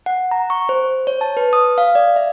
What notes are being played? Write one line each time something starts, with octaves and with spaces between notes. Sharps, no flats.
F#5
A#5
C#6
C5
C#5
A5
B4
D#6
F5
D5
E5